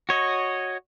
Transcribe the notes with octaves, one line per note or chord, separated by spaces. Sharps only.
F#4 C#5 D#5